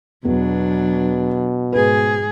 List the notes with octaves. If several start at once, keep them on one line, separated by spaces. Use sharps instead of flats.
E2 B2 F#3 D4
G#2 G#4 B4